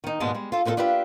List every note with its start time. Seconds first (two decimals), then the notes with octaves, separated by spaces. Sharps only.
0.04 D#3 D#4
0.20 D#2 G#2 B2 G#3 D4 A5
0.35 G3 G#3
0.52 F4 A4
0.65 F2 A#2 B3 F#4 A4 A#4
0.77 D4 F4 G4 B4 E5